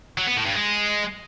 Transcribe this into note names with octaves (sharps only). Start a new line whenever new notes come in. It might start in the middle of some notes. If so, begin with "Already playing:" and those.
F#3
B3
A2
G2
G#3